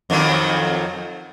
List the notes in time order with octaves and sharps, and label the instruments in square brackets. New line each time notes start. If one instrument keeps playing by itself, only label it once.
[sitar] F2 D#3 F#3